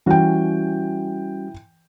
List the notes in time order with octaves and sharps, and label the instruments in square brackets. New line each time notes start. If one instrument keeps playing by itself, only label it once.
[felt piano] E3 G5 [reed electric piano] G3 C#4 F#4